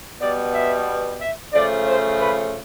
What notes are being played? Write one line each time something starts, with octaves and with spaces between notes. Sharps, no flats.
B2 G3 B3 D5
E5
E5
C#3 F3 A3 D5
C5
B4